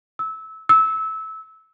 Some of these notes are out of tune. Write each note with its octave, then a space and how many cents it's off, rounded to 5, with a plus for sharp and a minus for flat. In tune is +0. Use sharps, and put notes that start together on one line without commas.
E6 -20
E6 -20